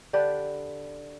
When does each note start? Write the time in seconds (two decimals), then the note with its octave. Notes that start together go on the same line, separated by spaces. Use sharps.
0.13 D3 D4 G4 B4